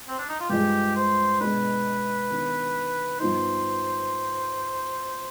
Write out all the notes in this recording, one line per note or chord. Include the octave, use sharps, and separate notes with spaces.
C4
D4
D#4
F4
G2 F3 G#3 G4
C5
B2 G#3 D4 B4
D#3 B3 D4
G2 F3 B3 D#4 C5